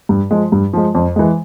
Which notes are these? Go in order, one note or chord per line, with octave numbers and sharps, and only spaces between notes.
G2
F3 G#3
G2
F3 G#3
F2
E3 G#3